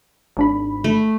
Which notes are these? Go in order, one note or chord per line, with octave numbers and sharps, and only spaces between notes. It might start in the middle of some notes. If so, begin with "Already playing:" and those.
G#1 D4 B5
A3